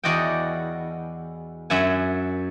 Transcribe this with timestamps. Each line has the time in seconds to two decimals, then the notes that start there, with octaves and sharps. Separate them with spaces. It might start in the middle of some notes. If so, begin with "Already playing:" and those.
0.04 E2 F#4 D5 D#5 F#5 G5
1.70 F#2 E5 F#5 G#5